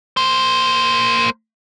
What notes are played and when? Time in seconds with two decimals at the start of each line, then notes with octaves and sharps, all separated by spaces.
0.17 A#3 C5